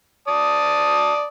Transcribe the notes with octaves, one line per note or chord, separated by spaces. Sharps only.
D5 A5 D#6